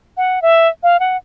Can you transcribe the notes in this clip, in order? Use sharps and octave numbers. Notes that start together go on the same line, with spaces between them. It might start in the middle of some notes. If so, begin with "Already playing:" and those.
F#5
E5
F5
F#5